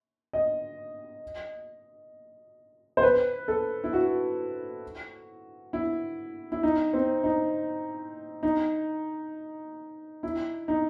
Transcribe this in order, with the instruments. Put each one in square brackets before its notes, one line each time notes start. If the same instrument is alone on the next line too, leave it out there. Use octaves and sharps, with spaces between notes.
[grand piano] D#5
C5
B4
A4
E4
F#4
E4
E4
D#4
C4
D#4
D#4
E4
D#4